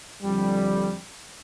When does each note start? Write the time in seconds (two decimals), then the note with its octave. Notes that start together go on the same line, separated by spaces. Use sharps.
0.23 F2 D3 G3